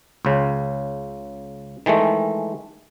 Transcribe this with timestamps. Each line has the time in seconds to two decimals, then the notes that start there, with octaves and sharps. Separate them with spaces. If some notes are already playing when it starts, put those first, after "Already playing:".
0.25 C#2 C#3
1.86 D#3 E3 G#3 A3